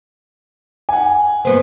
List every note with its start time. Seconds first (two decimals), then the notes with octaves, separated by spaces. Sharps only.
0.89 F#5 G#5
1.45 G2 B3 C5